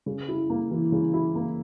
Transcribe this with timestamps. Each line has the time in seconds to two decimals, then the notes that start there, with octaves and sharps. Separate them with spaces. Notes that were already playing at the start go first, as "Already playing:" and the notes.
0.06 C#3
0.28 E4
0.50 A#3
0.71 E3
0.92 C#3
1.13 E4
1.35 A#3